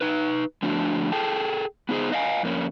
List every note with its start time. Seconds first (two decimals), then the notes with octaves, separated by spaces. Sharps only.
0.01 D#4 B4
0.63 D3 F3 A3 D4 F#4 C#5
1.12 G#4 A4 G5 A5
1.89 B3 D#4 G4 G#4 C5
2.12 D#5 F5 G#5
2.43 F2 A#3 C#4